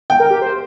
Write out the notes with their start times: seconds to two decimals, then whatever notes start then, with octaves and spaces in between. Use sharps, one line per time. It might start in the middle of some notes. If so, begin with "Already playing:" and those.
0.10 G5
0.20 A#4
0.30 G4
0.41 C5